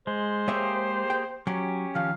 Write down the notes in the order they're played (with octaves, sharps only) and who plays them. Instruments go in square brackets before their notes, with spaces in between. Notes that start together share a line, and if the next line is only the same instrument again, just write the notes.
[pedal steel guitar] G#3 [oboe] C5
[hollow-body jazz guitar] G#3 C#5 E5 [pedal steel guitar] A#3 G4 G#4
[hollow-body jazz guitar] G5
[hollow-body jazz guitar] F#3 [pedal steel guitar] C#4 G4
[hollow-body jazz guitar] D#3 F3 [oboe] F5